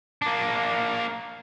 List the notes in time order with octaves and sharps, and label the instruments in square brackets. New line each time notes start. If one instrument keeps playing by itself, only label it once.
[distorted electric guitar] A#3 D4